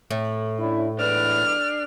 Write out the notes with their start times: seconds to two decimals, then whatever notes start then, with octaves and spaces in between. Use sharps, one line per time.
0.11 A2
0.60 C#4 D4 E4
0.99 E2 G#2 D4 B4 F6